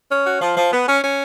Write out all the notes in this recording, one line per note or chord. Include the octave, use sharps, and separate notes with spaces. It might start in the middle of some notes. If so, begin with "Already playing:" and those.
C#4
F#4
F3
F3
B3
C#4
C#4